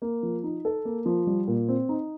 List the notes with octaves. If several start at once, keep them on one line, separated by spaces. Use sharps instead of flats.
A#3
F3
D#4
A4
A#3
F3
G3
A#2
C4
D#4